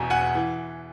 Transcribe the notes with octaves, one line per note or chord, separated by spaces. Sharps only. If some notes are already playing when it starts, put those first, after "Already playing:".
Already playing: E1 E2 B2 G#5 A#5
F#5 G#5
E3